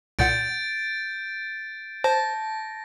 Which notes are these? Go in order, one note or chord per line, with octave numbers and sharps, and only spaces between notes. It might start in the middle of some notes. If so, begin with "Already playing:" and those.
C2 A#2 F#5 G6 A6 D7
C5 A5 A#6